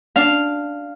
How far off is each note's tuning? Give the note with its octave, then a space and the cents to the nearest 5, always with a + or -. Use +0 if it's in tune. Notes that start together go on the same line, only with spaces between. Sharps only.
D4 +0 F5 -5